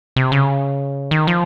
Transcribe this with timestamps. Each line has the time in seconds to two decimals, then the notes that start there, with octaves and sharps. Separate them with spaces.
0.16 C3
0.32 C#3
1.11 D#3
1.27 F3